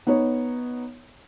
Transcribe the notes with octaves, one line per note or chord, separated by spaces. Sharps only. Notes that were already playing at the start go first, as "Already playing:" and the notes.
B3 D#4 C#5